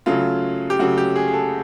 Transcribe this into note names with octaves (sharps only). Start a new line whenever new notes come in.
C#3 F#3 A3 F4
G4
C#3 F#3 A3 F#4
G4
G#4
G#4
A4